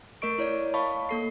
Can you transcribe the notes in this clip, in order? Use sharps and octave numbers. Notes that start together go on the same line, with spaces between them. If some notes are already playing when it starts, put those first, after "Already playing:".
A3 A#4 D#5 C#6 D7
E4 C#5 D5
D#5 F5 A5 B5 C#6
A#3 A4 C7